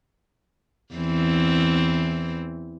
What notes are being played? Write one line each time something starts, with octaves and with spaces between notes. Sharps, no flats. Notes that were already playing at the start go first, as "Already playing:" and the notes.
E2 E3 C4